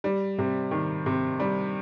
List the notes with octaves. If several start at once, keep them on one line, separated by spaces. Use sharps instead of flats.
G3
C3
D#3
C3
G3